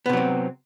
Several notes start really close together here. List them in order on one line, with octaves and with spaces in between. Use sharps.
B3 C3 F#3 C4